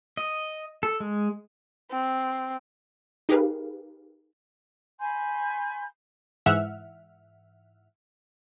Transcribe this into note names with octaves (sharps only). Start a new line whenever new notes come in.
D#5
A4
G#3
C4
D#4 G4 G#4 A#4 B4 F5
G#5 B5 C6 G6
G#2 E3 E5 F#5 F6